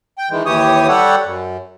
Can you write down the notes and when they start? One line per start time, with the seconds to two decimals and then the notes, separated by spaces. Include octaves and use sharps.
0.18 G5
0.31 D#3 E3 G#3
0.46 D#2 E3 G4 C#5 D#6
0.88 G3 G4 A4 C#5 F#5
1.24 F#2